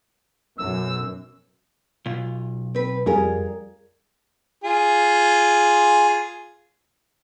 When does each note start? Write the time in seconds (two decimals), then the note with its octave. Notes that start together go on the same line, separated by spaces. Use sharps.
0.58 B1 F#2 E6
2.06 B1 F4
2.75 C4 B4
3.06 F2 G3 C#4 F4 G#4 A#4
4.64 F4 G#4